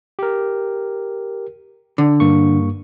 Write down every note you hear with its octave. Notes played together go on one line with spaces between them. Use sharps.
G4 A#4
D3
G2 A#3 C#6